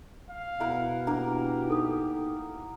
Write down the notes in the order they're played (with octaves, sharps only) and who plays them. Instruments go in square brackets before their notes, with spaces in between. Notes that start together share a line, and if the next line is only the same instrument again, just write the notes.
[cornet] F5
[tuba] B2 [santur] E4 A#4 F#5
[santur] A#3 A#4 [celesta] D4 [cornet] G4
[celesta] D#4 A4 D#6